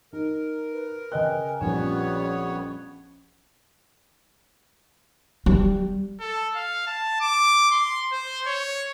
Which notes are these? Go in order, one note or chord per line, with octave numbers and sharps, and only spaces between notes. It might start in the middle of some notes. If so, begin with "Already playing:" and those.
D#4 A#4
B4
C#3 D#5 G5 G#5 F#6
G#5
A#1 F2 G3 B3 C#4 C#5
G3
A4
F5
A5
D6
C6
C5
C#5